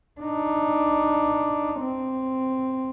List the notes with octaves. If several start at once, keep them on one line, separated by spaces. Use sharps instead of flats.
D4 D#4
C4